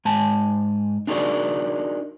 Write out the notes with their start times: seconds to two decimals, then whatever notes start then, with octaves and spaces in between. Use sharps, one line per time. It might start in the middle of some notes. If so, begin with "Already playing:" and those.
0.05 G#2 G#5 A5
1.07 D4 D#4 F#4 G#4 A#4 D5